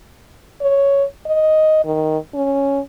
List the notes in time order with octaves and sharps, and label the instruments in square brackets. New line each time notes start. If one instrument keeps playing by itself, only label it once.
[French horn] C#5
D#5
D#3
C#4